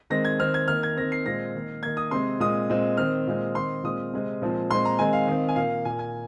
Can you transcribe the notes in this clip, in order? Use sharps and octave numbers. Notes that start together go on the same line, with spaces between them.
D#3 G#3 C4 A#6
G#6
D#3 C4 F6
G#6
D#3 A#3 F6
G#6
D#3 C4 A#6
C7
A#2 G#3 C4 A#6
D#3 A#3
D#3 A#3 G#6
D#6
C3 G#3 C4 C6
A#2 G#3 C4 D#6
A#2 G#3 C4
D#3 C4 F6
A#2 G#3 C4
D#3 C4 C6
A#2 G#3 C4 D#6
C3 G#3 C4
A#2 F3 G#3 C4
A#2 G#3 C4 C6
A#5
D#3 G#3 C4 G#5
F5
D#3 C4
G#5
A#2 A#3 F5
A#2 A#3 G#5
G#5